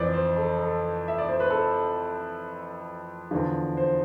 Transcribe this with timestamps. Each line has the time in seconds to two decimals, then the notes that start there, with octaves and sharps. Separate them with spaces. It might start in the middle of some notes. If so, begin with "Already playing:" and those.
Already playing: F2 E3 C5 D5
0.14 C5
0.37 A4
0.59 A4
1.08 E5
1.18 D5
1.29 C5
1.40 B4
1.50 A4
3.31 E2 D3 F3
3.77 C5